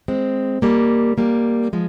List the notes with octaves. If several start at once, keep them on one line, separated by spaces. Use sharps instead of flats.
G#3 C4
G3 A#3
G3 A#3
F3 G#3